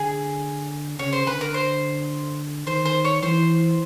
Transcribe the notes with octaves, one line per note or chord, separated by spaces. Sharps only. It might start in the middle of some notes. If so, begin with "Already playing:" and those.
Already playing: D3 G#4
C#3 C#5
C5
D3 B4
A#4
C5
D#3 C5
C5
C#5
E3 C5